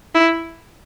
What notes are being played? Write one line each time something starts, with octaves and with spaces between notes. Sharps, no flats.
E4